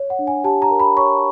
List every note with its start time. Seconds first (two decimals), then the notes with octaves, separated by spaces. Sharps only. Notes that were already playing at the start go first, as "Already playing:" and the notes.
Already playing: C#5
0.10 F#5
0.19 D4
0.27 G#5
0.44 G4 A5
0.62 A#5
0.70 A#4
0.80 B5
0.97 C#5 C#6